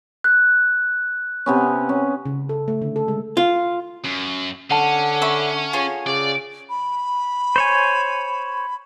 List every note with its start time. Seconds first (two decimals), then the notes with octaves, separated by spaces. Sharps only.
0.24 F#6
1.46 C3 B3 C#4
1.89 C#4
2.26 C#3
2.49 A4
2.68 A3
2.82 D3
2.96 A4
3.08 G#3
3.37 F4
4.05 F#2
4.71 D3 C#4 F#5 A5
5.22 E5 B5 C#6
5.73 F4 G#4 C#5
6.07 C#3 D5
6.70 B5
7.56 C5 C#5 G#5